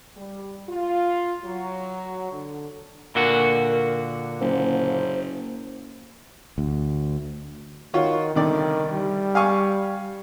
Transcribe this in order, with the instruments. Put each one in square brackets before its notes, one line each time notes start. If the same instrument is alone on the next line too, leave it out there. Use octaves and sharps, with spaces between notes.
[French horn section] G3
F4
F#3
D3
[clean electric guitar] A#2 D3 F#4 [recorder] A#4
[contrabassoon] F#1 [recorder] C5
[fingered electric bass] D2
[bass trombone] D#3 [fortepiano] F4 F#4 C#5
[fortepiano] C2 D3 D5 [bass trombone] D#3
[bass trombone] G3
[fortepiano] F5 G#5 C#6